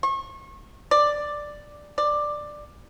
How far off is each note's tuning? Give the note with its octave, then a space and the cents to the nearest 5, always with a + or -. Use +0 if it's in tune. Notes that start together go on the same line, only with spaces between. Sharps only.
C#6 -35
D5 +5
D5 +10